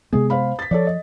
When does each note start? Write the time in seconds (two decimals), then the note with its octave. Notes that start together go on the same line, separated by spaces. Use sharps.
0.13 C3 G#3 B3 G#4
0.30 C5 F5 B5
0.59 A6 B6
0.71 F3 A4 C#5 D5
0.87 D#5